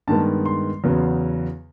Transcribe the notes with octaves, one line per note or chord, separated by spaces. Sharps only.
G2 D#3 G#3 B3 A5
C6
E2 C#3 F#3 B3